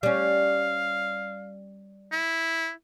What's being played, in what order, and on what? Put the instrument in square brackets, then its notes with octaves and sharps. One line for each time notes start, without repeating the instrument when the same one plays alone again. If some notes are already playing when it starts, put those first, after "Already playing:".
[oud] G3 C#4 [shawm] F5
[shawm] E4